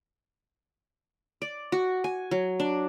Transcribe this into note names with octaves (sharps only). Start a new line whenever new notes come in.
D5
F#4
G#5
F#3
D4